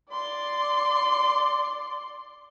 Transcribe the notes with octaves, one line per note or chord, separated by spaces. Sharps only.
D5 C6